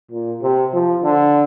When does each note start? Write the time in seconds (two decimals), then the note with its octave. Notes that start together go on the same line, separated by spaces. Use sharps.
0.11 A#2
0.42 C3
0.73 F3
1.03 D3